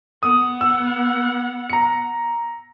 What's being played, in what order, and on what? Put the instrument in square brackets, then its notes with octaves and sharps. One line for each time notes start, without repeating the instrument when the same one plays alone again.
[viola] B3 F#5 [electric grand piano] D#6
[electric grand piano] E6
A#5 C#7